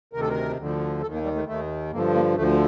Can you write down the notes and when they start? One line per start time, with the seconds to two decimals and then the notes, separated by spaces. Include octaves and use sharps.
0.13 D2 C3 D#3 A#4
0.21 A4
0.30 A#4
0.58 D2 D3 F3
1.02 D#2 D#3 A4
1.14 A#3
1.24 G3
1.36 A3
1.47 D#2 D#3 A3
1.92 G2 D3 F3 A#3
2.15 A#3
2.36 D2 D3 F3 A3